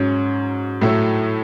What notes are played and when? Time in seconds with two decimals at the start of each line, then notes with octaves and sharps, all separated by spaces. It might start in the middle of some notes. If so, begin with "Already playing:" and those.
Already playing: G#2 F#3 C#4
0.81 A2 F#3 A3 E4